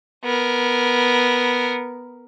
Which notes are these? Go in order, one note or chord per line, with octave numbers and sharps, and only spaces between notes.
B3 A#4